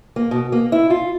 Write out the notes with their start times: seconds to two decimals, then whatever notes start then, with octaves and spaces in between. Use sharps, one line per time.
0.16 A#3
0.31 B2
0.52 A#3
0.72 E4
0.90 F4